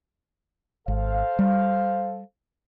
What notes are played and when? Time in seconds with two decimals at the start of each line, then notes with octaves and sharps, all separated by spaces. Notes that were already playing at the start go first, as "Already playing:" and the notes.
0.88 G#1 A4 C5 F5
1.39 G3